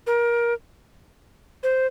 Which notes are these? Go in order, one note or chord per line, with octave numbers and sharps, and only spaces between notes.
A#4
C5